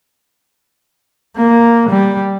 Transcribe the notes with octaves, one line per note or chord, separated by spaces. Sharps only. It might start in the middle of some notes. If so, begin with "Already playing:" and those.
A#3
G3